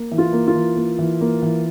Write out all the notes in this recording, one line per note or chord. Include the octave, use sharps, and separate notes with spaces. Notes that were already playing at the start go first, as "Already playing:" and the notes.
Already playing: A#3
E3
F4
A#3
F4
E3
A#3
E3
A#3
E3